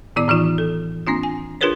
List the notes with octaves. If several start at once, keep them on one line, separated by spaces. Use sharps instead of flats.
A2 D#3 B3 E4 D5 D6
A2 E3 D#4 F4
A4
A#3 C4 D4 F4
G#5
D4 F4 G#4 A#4 B4 C#5